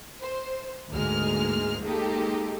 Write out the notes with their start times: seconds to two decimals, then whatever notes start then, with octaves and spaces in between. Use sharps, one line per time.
0.21 C5
0.93 D2 G#2 G#3 A#3 G#4 F6
1.83 G#3 A#3 D#4 G4 A4